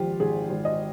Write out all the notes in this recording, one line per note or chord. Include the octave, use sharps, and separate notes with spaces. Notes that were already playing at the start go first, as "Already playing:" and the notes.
Already playing: G#1 F3 F4 G4
G#1 G#4
G#1
D#5